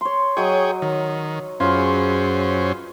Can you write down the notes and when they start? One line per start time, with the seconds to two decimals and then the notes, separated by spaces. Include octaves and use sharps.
0.01 C#5 C6
0.37 F#3 G#4 C#5 D#5 G5
0.82 D#3 D#5
1.60 F#2 C#4 F4 G#4 B4 C5